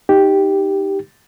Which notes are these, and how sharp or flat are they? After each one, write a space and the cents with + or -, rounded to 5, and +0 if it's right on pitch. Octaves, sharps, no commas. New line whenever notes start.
D#4 +0 G4 +0